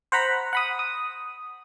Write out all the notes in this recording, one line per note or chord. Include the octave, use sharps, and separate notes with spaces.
C5 F#5 A#5 B5
F#5 B5 D#6
D#6